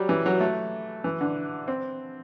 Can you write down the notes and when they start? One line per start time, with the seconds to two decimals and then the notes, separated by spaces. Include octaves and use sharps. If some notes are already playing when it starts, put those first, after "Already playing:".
Already playing: F#3 G3
0.09 E3
0.26 F#3
0.40 A3
1.04 E3
1.21 D3
1.68 C4